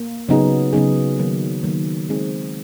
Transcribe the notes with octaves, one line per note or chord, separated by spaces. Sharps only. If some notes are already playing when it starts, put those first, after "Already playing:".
Already playing: A#3
C#3 F#3 B3 D#4 G#4
C#3 F#3 B3 D#4 G#4
D#3 F#3 A#3
D#3 F#3 A#3
G#3 C4 D#4 G#4